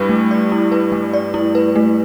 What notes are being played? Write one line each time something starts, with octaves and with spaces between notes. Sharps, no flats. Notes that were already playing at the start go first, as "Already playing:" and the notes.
Already playing: G2 G3 E4 B4
A3
D5
E4
B4
A3
D5
E4
B4
A3